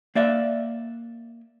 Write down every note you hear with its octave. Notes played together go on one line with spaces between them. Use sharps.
A#3 D5 E5